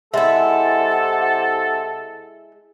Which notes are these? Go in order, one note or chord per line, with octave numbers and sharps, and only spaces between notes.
C3 G#3 E4 A4 E5 F#5